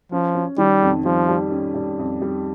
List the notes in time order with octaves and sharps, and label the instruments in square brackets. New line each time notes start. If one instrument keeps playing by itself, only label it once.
[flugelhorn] F3 [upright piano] C#4
[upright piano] C#4
[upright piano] D#3 [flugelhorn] G3
[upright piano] F2
[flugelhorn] F3 [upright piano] G3
[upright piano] G3
C#4
G3
F2
G3